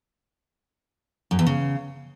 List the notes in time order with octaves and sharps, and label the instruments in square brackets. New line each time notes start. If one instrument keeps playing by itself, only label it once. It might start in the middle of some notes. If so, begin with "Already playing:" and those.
[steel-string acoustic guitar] F#2
E2
C#3